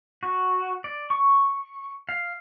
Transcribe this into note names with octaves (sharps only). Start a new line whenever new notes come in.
F#4
D5
C#6
F5